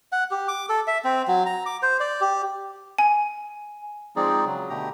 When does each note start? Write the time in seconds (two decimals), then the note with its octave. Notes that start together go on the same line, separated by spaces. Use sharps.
0.12 F#5
0.31 G4
0.48 D6
0.69 A4
0.87 E5
1.05 C4
1.28 F#3
1.46 A#5
1.66 D6
1.83 C5
2.00 D5
2.21 G4
2.98 G#5
4.16 F3 G#3 C4 D#4 G#4 D5
4.45 C#3 F#3
4.70 B2 D3 A3 G4 A#5